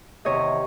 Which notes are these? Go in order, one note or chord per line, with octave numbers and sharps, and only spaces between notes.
E2 C3 D#3 C#5 D#5